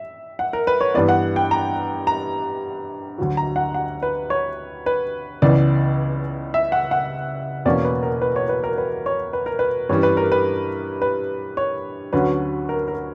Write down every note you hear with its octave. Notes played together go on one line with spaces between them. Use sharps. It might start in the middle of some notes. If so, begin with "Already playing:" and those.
Already playing: E5
F#5
A#4
B4
C#5
G2 E3 B3 D5
F#5
G5
A#5
A#5
D2 D3 F#3
A#5
F#5
F#5
B4
C#5
B4
C#2 C#3 E3 B3 D5
E5
F#5
F#5
E2 B2 A#3 C#4 D5
B4
A#4
B4
C#5
B4
A#4
B4
C#5
B4
A#4
B4
G2 E3 G3 C#4 C#5
B4
A#4
B4
B4
C#5
D2 D3 F#3 C#4 B4
A#4
A#4